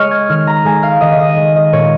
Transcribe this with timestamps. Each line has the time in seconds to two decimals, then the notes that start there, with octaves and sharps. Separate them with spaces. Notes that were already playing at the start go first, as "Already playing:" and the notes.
Already playing: G#3 C#5 D#5 C#6 F6
0.11 G#6
0.29 D#3 F6
0.47 A#5
0.65 G#3 G#5
0.83 F5
1.01 D#3 D#5
1.19 D#5
1.37 G#3
1.55 D#5
1.73 A#2 C#5